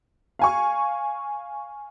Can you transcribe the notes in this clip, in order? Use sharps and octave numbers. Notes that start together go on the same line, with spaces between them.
F5 G#5 C#6